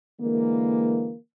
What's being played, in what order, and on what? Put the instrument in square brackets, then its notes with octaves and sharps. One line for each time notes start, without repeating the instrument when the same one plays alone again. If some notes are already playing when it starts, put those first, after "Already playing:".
[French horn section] D3 E3 G#3 A#3